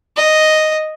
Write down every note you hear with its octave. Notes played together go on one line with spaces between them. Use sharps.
D#5